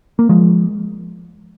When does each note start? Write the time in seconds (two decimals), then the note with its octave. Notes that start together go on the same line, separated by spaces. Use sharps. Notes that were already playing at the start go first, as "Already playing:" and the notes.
0.19 A#3
0.29 F3 G#3